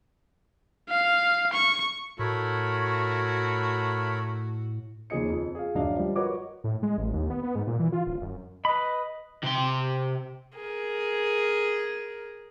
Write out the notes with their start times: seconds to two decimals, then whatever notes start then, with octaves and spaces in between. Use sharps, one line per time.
0.90 F5
1.53 C#6
2.19 A2 A3 F#4 A#4 C#5 B5
5.10 D#2 C#3 F3 G#4 D#5 C#7
5.30 F2
5.55 G#4 F5
5.75 D1 F#2 F#3 D4 D#5 F5
5.97 F3 G3
6.16 F#4 A#4 B4 C#5 D#5 D6
6.64 A2
6.83 G#3
6.98 A1
7.13 D#2
7.30 B3
7.43 B3
7.56 G#2
7.67 A#2
7.79 E3
7.92 F4
8.07 D1
8.21 F#2
8.65 B4 D#5 B5
9.44 C3 C6
10.55 G#4 A#4